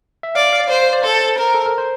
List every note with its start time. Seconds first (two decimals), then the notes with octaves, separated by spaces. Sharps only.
0.23 E5
0.35 D5 F5
0.53 F5
0.69 C5 D5
0.93 D5
1.04 A4 C5
1.38 A#4
1.54 A4
1.66 A#4
1.78 C5